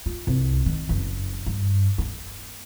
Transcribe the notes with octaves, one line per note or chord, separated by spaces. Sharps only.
F4
C2
D#3
F#1
G2
A#3